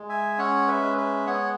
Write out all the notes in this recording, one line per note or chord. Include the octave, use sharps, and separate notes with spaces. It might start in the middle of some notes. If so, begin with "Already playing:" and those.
Already playing: G#3
E5 G#5
C#4 C#5 F#5
B4 E5
G#3
B4 E5
B3 C#5 F#5